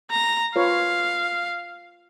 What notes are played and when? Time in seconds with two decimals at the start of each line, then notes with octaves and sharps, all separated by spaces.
0.12 A#5
0.56 F4 B4 C#5 F5